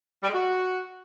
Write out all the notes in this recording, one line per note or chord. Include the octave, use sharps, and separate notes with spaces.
G3
G#3
F#4